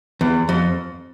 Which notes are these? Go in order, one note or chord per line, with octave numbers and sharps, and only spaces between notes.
E2
F2